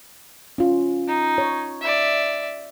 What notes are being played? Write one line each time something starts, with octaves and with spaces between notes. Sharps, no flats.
C#4 F4
D#4
C#5
D5 E5